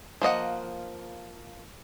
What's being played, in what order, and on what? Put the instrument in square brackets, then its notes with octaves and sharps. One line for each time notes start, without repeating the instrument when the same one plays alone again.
[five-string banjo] F3 A#3 D#5 F#5